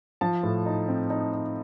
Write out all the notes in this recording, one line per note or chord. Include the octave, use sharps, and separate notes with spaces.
F3 A5
A2
D#4
C4
D#4
D#4